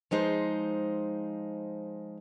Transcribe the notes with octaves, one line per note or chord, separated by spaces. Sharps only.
F3 G#3 D#4 C5